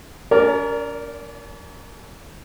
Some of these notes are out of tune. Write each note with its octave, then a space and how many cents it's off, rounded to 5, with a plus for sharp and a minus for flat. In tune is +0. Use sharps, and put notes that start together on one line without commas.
C#4 +45 A#4 +0 D5 -10